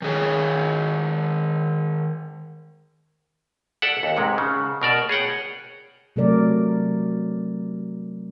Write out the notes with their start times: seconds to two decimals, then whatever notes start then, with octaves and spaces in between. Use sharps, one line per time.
0.02 D#3 G#4 C#5
3.82 A4 D5 E5 F#5
4.03 D#2 F#5
4.17 G#2 C3 G#3
4.38 C#3
4.82 B2 A#4 D5 A5
5.09 G#4 C#5 F#5 G5
6.16 C3 F#3 A3 A4 A#4 D5